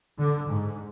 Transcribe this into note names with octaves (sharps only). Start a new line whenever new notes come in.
D3
G#2